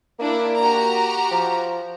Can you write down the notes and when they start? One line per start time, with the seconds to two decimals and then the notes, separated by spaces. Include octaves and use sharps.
0.19 A#3 D4 E4
0.59 F#4 G4 A#5
1.31 F3